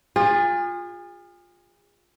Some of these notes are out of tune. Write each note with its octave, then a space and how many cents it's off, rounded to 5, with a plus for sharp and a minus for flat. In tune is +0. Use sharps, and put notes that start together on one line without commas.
F4 +15 G#4 -35